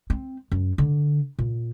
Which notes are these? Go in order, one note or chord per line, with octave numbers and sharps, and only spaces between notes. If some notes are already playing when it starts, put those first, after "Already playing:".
C4
F#2
D3
A#2